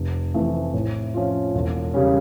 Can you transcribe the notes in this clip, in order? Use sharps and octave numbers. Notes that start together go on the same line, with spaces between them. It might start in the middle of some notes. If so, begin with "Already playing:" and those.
Already playing: F1
F2 E3 A3
A2
F3 C#4 F4
E1
C#3 G3 C#4